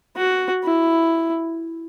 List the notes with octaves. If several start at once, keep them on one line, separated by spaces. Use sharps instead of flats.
F#4
E4